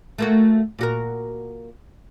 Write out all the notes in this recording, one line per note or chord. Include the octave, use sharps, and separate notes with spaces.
A3 A#3 F#4
A#2 F#4 A#4